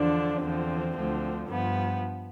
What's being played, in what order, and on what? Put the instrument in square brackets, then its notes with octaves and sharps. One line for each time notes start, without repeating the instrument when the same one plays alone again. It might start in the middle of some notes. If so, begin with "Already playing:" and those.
Already playing: [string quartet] E2 D3 F3 D4
E2 D3 F3 C4
D2 D3 F3
G2 F3 B3